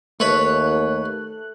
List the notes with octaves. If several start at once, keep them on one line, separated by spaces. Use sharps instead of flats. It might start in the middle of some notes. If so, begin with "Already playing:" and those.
D#2 A3 B4 C#5 F#6